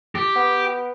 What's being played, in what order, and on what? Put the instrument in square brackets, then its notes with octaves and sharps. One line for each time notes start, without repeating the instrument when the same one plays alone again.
[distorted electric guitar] G4
[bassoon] B3